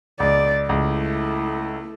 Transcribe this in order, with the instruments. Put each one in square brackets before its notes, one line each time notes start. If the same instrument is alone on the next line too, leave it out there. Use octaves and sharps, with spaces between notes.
[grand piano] C#2 [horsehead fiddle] D5
[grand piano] C#2 [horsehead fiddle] A3 E4